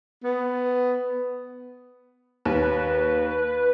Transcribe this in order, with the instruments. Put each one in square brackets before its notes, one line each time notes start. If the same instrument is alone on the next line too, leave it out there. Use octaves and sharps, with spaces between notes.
[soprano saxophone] B3
[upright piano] D#2 [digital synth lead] B4